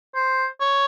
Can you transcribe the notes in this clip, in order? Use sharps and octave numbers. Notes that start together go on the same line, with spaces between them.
C5
C#5